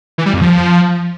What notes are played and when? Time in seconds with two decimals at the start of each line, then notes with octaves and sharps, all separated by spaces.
0.18 E3
0.26 G3
0.34 F2
0.41 F3